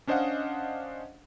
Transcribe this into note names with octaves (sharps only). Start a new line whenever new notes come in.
C#4 D4 C5 D#5 F5 F#5